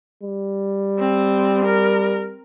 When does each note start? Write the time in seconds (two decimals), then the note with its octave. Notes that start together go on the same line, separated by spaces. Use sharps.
0.23 G3
0.99 C4
1.65 A#4